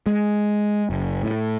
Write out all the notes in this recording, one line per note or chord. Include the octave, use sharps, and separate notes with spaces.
G#3
F#1
A2